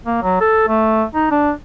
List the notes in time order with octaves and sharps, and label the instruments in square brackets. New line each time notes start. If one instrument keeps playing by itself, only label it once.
[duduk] A#3
F#3
A4
A3
D#4
D4